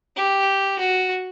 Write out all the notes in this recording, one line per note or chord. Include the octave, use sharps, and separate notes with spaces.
G4
F#4